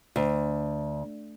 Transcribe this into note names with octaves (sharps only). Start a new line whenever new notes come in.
D2